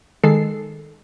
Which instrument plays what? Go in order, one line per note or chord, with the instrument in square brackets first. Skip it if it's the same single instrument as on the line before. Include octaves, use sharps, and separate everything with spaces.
[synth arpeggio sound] D#3 G#3 A4 C7